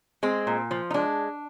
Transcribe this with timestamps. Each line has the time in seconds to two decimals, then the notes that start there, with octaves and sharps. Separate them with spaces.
0.23 G#3 C4
0.47 A#2
0.71 F3
0.91 D#4
0.94 G#3 D4